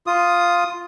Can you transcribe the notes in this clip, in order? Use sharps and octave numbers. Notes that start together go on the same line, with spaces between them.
F4 D#6